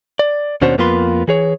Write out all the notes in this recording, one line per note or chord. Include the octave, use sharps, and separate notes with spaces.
D5
D#2 B2 C#4 D4 F#4 C5
F2 A#3 B3 F4 B4 C6
E3 G#4 C#5